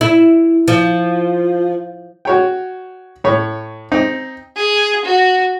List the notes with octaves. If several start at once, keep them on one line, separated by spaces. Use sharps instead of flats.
E4
F3
F#4 C#5 G5
A2 C#5
C4 D#4
G#4
F#4